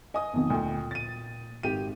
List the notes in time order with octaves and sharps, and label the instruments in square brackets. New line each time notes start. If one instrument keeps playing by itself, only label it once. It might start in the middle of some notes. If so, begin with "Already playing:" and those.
[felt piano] D#5 [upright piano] G#5 D#6
[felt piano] B1 F2 D#3
[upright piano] D2 [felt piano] A#2 G5
[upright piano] A6 D#7
[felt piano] G#1 [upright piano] G4 D#7